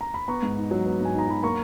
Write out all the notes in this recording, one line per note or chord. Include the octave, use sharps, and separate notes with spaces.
A#5
B5
B3 A#5 C#6
G#2
D#4
F#3
B3
G#2 G#5
D#4 A#5
F#3 B5
A#3 A#5 C#6